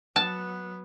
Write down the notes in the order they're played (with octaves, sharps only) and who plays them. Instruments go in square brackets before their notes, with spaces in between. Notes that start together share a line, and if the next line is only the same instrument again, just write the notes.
[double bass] F#3 B3 [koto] A5